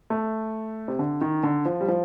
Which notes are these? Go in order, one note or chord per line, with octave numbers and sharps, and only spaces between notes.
A3
C3
D3
D#3
D3
F3
G3
F3